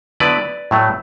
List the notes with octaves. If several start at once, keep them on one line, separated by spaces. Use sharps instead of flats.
D3 F#3 B3 E4 B4 D5
A2 F#3 A3